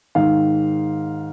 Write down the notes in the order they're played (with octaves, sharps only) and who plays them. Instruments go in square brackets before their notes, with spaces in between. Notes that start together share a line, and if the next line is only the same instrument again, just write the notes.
[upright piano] G#2 D#3 F5